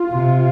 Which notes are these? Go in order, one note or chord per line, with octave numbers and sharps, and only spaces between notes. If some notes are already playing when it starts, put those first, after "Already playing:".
Already playing: F4
C3